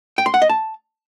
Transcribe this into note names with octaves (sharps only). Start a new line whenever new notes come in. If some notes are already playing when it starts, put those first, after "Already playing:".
G5
C6
F#5
D#5
A5